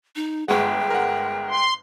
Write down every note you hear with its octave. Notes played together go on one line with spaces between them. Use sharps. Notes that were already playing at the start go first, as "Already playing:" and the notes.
D#4
G1 G#3 F#5 G5 C#6
A#4 F#5
C6